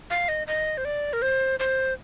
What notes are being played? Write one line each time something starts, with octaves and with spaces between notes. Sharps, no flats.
F5
D#5
D#5
C5
D5
A#4
C5
C5